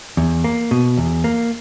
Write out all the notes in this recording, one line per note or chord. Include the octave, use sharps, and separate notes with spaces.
E2
A#3
B2
E2
A#3